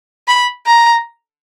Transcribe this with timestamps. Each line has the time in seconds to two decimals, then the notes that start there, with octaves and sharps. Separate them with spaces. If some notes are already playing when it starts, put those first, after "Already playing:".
0.28 B5
0.66 A#5